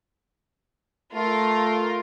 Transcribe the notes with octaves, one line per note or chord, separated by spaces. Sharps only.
A3 F4 A#4